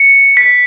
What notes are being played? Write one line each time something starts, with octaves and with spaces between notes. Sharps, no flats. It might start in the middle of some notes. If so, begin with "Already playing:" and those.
Already playing: C#7
B6